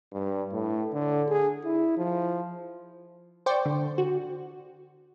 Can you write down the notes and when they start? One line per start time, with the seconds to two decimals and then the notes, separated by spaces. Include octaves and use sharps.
0.12 G2
0.52 A2
0.93 D3
1.29 G#4
1.64 E4
1.97 F3
3.46 C5 D5 G5 C#6
3.65 D3
3.98 F#4